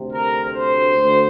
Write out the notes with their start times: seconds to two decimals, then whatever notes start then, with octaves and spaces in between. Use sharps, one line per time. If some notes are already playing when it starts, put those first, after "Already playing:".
Already playing: D2 C3
0.13 A#4
0.55 C5
0.98 D2